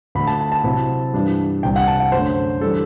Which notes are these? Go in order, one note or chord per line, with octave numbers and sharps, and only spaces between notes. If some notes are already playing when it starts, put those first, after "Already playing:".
D2 D3 A3 B5
A5
A5
A5
C3 F#3 C4 E4
G2 E3 G3 D4
C2 C3 G3 D4 G5
F#5
A5
F#5
F#2 D3 A3 C5
E3 G3 D4 A4